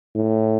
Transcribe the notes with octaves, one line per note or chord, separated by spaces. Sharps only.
A2